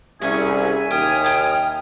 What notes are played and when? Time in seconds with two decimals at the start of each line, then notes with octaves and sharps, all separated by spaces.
0.22 C2 C#4 G#4 E5 G#5
0.91 D#2 G5 D#6 F6
1.24 G5 A5